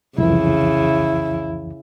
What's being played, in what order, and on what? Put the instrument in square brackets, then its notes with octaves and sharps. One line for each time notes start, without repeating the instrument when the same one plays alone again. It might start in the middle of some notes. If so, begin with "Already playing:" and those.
[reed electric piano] C2 F2 E3 [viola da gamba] C#3 [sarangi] E4